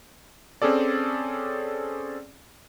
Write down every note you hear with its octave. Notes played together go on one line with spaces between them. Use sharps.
C4 C#4 G#4 A4 D5